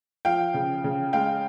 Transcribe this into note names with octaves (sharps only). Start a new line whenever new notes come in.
F3 F5 G5
C#3
C#3
G#3 F5 G5